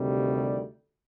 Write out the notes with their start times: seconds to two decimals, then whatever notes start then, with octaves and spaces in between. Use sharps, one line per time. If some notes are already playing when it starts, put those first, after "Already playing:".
Already playing: D2 C3 D#3 G3
0.34 D5